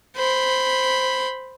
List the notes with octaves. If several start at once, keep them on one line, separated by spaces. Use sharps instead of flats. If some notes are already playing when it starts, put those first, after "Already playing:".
C5 B5